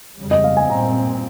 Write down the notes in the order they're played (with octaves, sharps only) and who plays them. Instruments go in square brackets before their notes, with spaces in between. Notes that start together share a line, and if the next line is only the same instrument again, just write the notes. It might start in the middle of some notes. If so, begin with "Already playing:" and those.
[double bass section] F2 C#3 G3
[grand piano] D#5
F5
G#5
[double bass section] A#2 G3 C4 [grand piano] A#5